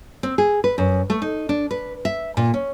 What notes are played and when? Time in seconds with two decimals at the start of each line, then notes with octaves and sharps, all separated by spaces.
0.23 C4
0.38 G#4
0.64 B4
0.78 F#2
1.10 A3
1.22 D#4
1.49 D4
1.71 B4
2.05 E5
2.37 A#2
2.54 C#4